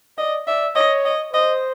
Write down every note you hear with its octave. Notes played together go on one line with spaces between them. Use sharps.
D5 D#5
D5 E5
C#5 D#5
D#5
C5 D#5